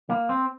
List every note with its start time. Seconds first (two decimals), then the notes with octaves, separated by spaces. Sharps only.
0.10 A#3
0.29 C4